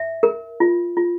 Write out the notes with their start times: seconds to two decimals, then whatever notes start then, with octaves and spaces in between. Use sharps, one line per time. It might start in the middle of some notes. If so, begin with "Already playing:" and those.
Already playing: E5
0.23 A#4
0.60 F4
0.97 F4